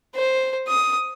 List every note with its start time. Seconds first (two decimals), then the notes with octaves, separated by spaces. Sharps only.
0.16 C5
0.68 D#6